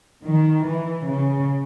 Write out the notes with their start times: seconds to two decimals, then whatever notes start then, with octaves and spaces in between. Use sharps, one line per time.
0.24 D#3
0.66 E3
1.07 C#3